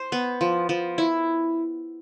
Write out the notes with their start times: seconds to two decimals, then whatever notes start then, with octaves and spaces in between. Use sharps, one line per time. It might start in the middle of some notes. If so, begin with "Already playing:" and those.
Already playing: C5
0.12 B3
0.41 F3
0.69 F3
0.98 E4